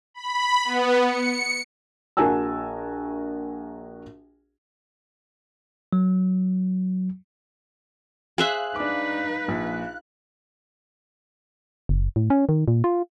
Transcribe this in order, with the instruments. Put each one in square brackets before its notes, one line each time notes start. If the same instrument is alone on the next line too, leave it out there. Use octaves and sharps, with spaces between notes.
[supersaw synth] B5
B3
C#7
[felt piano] A#1 F#4 A#4 G#5 A5 E6
[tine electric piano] F#3
[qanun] G#4 C5 E5 [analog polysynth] F5 F#6
[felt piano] D4 D6 [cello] D#4 B4
[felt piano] A#1
[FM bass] F#1
A2
C#4
D#3
A#2
F4